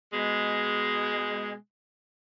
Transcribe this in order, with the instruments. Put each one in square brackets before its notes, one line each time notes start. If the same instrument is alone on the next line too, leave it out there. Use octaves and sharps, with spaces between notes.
[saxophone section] B2 G#3